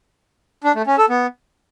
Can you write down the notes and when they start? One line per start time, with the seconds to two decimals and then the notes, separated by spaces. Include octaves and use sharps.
0.64 D4
0.75 A3
0.87 C#4
0.98 A4
1.09 B3